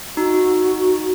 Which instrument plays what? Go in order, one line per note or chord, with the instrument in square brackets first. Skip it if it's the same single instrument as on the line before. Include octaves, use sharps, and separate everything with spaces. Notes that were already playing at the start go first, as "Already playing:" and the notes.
[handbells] D#4 [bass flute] F#4